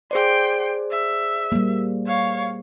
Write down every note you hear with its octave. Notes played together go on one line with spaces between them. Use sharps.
G#4 C5 D5 G5 C6
E5
G3 A#3
C#5 F5